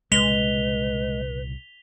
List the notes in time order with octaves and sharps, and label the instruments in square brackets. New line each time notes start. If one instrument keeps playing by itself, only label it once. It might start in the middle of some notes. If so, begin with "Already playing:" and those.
[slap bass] C2 A#2 C#3 [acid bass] G#3 [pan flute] B4 [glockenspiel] B6 F7 G7